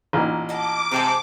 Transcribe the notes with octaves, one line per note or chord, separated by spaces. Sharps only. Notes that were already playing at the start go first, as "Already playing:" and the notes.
A1 A#2 D#4
D#5 F#5 A5 D6
C3 G#3 A5 A#5